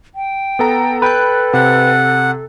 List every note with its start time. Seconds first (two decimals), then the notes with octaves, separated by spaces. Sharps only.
0.15 G5
0.59 B3 A4 A#5
1.02 A4 B4 G5 B5 F#6
1.53 C3 F#5